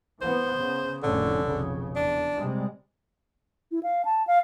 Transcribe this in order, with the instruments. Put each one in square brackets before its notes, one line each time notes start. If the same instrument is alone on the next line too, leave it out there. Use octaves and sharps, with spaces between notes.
[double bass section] E3 B3 [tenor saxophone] C5
[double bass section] C#3
[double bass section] F1 A2 C#4 [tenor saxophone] D3
[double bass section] F1 B1 C#3
[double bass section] E2 [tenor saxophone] D4
[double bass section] C3 G3 G#3
[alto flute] E4
F5
A5
F5